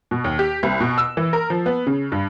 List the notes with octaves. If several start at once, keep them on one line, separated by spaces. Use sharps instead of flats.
B2
D#2
G4
C2
B2
E6
E3
A#4
F3
B3
C#3
G2